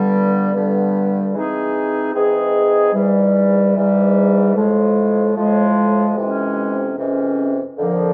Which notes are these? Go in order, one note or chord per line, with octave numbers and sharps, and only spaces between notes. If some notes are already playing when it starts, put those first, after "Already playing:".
Already playing: G2 D3 G3 B3
G2 D3 G3 B3
E3 G#3 C4 D#4 G#4
E3 G#3 C4 D#4 G#4
G#2 E3 G3
G#2 E3 G3
A2 F3 G#3
A2 F3 G#3
F2 C3 E3 G#3 C#4
F2 C3 E3 G#3 C#4
F2 D3 F3 A#3